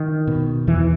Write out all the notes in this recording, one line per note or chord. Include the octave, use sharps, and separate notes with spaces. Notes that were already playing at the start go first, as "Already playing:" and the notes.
Already playing: D#3
B2
E2 E3